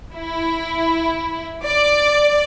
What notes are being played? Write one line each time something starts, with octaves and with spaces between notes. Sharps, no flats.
E4
D5